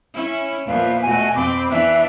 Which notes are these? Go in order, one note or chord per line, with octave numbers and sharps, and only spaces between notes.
C#4 E4
E2 A#2 F3 B4 F5
B2 A3 F#4 G#5
F2 C4 B5 D6
E3 B3 D4 E5 F#6